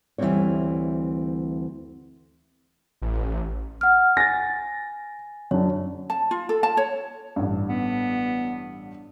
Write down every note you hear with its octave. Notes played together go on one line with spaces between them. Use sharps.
D2 E3 F#3 G3 C4 C#5
A1
F#5 F6
G#5 A6 A#6
F#2 D4 C#5
A5
F4
A4
A5
C#5
A1 G2
B3